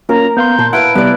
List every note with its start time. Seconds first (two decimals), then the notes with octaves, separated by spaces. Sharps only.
0.09 A#3 C#4 F4 A#4 A#5
0.37 B3 F5 C6 G6
0.59 A#2 A5 C6
0.73 E4 B4 F5 F#5 D7
0.95 C3 G3 B3 B4 D5